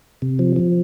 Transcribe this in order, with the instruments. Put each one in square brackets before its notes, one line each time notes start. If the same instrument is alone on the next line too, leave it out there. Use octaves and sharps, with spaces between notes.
[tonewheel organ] C3
F3
F3